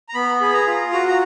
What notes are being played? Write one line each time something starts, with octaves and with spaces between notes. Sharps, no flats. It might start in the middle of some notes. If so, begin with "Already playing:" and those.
A#5
B3 B5
G#4 B5
A#5
F4
F#4 A#5
A#5